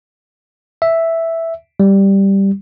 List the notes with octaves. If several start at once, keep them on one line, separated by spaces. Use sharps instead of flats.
E5
G3